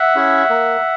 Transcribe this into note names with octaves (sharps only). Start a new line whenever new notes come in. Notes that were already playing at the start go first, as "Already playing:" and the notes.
Already playing: E5 F#5
C#4 E4 G#4
A#3